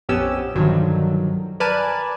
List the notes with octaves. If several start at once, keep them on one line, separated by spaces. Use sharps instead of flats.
A#1 F2 B3 C#4 G4 E6
B1 G2 D3 D#3 F3 F#3
A#4 B4 D5 G#5 A5